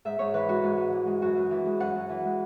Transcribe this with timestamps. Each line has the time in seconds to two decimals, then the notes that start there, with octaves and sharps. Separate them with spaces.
0.05 G#2 E5
0.19 G#2 C#5
0.34 E3 B4
0.49 G#3 F#4
0.64 G#2
0.78 G#2
0.92 E3
1.07 G#3
1.22 F#2 F#4
1.36 F#2
1.51 E3
1.66 G#3
1.80 F#2 F#5
1.96 F#2
2.09 E3
2.24 G#3